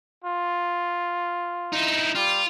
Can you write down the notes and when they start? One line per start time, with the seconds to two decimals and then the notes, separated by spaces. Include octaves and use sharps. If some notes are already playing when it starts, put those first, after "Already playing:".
0.24 F4
1.73 D#4 E4
2.15 G3 F4